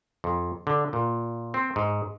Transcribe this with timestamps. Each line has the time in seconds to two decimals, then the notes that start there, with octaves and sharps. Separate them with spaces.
0.24 F2
0.67 D3
0.93 A#2
1.54 C4
1.76 G#2